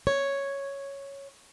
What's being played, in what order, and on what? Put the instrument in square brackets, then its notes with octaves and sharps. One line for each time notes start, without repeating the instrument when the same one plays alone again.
[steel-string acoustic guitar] C#5